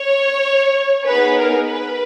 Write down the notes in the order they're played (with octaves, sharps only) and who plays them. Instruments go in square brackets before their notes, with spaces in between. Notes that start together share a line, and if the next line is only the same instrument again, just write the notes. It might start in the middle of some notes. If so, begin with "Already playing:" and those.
Already playing: [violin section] C#5
B3 D#4 G#4 B4
A#4
B4